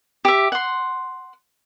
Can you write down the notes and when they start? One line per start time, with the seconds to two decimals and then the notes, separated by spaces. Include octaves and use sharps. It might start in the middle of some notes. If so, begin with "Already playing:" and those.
0.25 G4 E5
0.52 F#5 C6